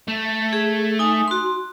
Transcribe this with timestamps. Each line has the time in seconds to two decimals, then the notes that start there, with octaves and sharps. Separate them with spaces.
0.08 A3
0.53 G#4
0.99 D#4 G#5 D#6
1.28 F#4 C6